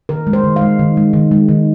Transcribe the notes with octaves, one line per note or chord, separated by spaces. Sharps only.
D#3 A#4
G#3
C5
D#3
G#3 F5
D#3
G#3
D#3
G#3
D#3